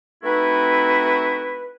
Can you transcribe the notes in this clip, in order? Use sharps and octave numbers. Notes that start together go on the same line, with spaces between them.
A3 C4 D#4 E4 F#4 B4